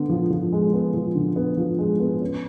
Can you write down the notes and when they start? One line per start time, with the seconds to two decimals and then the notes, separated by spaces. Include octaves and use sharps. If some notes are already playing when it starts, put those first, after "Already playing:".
Already playing: D3 B3
0.09 F3
0.30 F3
0.53 G#3
0.74 B3
0.94 F3
1.15 D3
1.36 B3
1.57 F3
1.79 G#3
2.00 B3
2.22 C#4